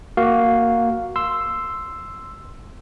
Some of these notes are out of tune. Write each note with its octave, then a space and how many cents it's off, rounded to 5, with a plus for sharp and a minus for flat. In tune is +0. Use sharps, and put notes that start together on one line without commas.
A#3 +0 F#4 +0 F5 +0
C6 +0 E6 +5